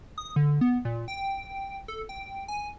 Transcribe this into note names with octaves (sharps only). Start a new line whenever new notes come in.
D#6
D3
B3
A#2
G5
A4
G5
G#5